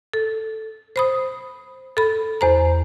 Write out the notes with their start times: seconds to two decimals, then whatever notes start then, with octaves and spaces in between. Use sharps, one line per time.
0.14 A4
0.96 C5 B5 D#6
1.97 A4 B5
2.41 E2 C5 A#5